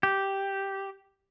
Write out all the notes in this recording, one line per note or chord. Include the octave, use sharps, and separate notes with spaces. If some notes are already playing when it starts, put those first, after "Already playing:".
G4